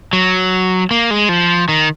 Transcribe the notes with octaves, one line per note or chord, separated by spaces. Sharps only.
F#3
A#3
G#3
F3
D#3